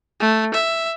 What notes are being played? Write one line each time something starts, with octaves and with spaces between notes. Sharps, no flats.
A3
E5